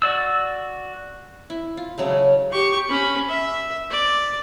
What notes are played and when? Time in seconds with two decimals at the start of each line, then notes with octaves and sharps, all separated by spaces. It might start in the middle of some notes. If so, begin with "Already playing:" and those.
0.02 F#4 D5 E6
1.50 E4
1.77 F4
1.98 C#3 F#3 G#3 A3
2.52 G4 C#6
2.89 C#4 B5
3.29 E5
3.91 D5